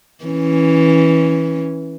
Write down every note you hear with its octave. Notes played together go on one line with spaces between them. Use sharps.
E3 C#4